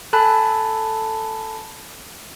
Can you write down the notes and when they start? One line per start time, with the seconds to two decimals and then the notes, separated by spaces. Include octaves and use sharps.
0.13 A4 G#5 A5 B5 F#6